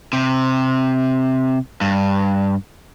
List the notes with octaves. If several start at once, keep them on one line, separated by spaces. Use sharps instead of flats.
C3
G2